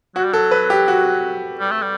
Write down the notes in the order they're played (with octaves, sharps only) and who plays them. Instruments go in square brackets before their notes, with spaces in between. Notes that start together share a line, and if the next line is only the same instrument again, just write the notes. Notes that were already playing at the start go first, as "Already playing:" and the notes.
[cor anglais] F#3 [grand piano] F#4
[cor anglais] G3
[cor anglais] F#3 [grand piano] A4
[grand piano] B4
G4
F#4
[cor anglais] G3
A3
G3